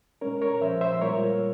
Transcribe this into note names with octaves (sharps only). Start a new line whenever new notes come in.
A#2 G#3 C#4 A#4 C#5
A#4 C#5
A#2 F3 G#3 C5 E5
C5 E5
A#2 G3 A#3 F4 A#4 C#5